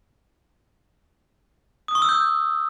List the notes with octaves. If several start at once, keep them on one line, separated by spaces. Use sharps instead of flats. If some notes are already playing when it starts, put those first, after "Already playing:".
D#6
C#6
E6
G6